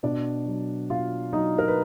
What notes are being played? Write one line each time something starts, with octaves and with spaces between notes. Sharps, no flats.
B2 D4 D5
F#3
B2 F4 F5
F#3 D#4 D#5
A#4
B4